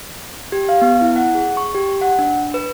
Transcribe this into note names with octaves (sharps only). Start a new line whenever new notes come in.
G4
F5
B3
E4
F#5
G#4
C#6
G4
F#5
D4
B4